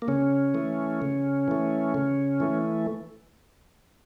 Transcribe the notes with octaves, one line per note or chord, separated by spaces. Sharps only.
A#3
C#3 C#4
E3 A3
C#3
E3 A3
C#3
E3 A3